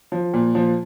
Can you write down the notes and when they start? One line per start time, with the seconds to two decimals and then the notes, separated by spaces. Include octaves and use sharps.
0.12 F3
0.34 A#2
0.55 F3